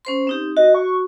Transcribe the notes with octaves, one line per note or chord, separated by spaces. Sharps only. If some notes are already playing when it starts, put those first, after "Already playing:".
C#4 C5 C6
C4 D#4 G4
F#4 D#5
C#6